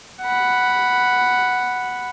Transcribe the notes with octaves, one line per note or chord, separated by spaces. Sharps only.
F#5 B5